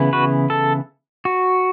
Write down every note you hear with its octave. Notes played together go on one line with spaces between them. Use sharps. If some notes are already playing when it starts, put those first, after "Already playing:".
Already playing: C#3 E3 B3 E4
F#4 B4
A4
F#4